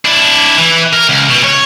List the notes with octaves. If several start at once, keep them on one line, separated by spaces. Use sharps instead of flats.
D4 E4
E3
A#4
C#2
B2
C#5